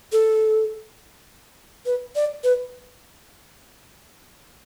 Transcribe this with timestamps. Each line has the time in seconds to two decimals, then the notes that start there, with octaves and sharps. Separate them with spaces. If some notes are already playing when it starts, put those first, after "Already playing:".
0.12 A4
1.86 B4
2.15 D5
2.44 B4